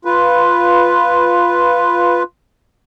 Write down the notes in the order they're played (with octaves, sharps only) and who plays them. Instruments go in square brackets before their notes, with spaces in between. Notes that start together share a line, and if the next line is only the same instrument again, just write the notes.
[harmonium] F4 B4